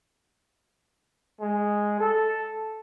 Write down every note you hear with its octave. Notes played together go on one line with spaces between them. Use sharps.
G#3
A4